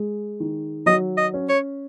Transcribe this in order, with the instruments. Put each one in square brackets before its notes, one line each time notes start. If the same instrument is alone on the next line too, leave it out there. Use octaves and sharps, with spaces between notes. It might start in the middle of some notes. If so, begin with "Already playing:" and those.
Already playing: [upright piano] G#3
D#3
[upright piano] F#3 [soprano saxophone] D#5
[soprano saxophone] D#5
[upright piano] C#4
[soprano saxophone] C#5